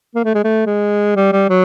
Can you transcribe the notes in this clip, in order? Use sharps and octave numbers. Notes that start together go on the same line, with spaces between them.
A#3
A3
G#3
A3
G#3
G3
G3
F#3